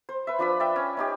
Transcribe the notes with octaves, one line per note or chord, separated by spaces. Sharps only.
C5
B4 E5
F3 D4 B4 B5
D5 E5 G5
C#4
C#4 D#4 G4